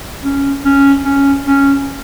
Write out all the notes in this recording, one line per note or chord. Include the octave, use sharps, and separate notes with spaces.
C#4
C#4
C#4
C#4